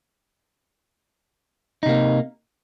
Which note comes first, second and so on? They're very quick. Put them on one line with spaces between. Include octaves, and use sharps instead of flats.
D#4 C3 A#3